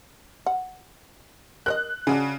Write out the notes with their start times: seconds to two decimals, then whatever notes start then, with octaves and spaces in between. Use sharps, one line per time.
0.46 F#5
1.66 A#4 C#5 D#5 F#6
2.07 C#3 D4 F#4 G#4